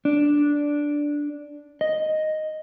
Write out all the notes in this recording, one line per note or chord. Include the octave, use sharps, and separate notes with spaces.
D4
D#5